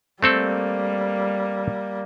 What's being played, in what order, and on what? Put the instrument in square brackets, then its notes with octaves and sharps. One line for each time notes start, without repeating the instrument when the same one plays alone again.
[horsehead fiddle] G3 A#3 [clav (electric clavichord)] A3 C4 A4